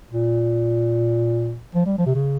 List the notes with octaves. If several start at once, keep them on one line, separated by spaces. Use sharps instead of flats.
A#2
F3
G3
F3
C3
C#3